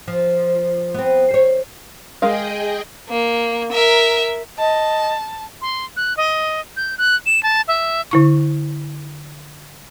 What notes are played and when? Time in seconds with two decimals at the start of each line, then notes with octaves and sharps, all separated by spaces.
0.08 F3
0.94 B3 C4
1.31 C5 C#5
2.22 G#3 G#4 A#4 D#5 F5 G5
3.09 A#3
3.72 A#4 E5
4.58 D#5 A5
5.62 C6
5.97 F#6
6.17 D#5
6.77 G6
6.98 F#6
7.26 E7
7.43 A5
7.68 E5
8.11 D3 E4 C#6